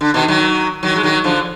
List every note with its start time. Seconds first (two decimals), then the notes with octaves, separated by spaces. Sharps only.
0.01 D3
0.14 B2 D#3
0.28 D#3 F#3
0.83 D#3 F#3
0.96 G#3
1.03 D#3 F#3
1.24 D3 F3